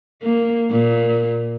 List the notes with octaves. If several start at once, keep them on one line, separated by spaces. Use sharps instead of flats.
A#3
A#2